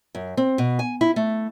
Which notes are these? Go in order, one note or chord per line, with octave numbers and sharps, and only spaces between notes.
F#2
C4
B2
G#5
E4
A3